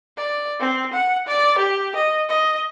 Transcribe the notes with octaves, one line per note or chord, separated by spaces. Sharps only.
D5
C4
F#5
D5
G4
D#5
D#5